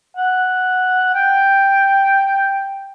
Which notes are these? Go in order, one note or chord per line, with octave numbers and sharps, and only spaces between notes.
F#5
G5